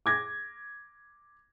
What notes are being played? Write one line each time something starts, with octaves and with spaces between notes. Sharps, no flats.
D6 G#6 A#6